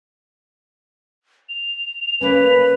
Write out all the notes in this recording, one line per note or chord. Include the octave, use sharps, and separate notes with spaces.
F7
C#3 A#3 C#4 B4